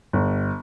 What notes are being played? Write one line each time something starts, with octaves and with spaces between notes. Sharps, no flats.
G1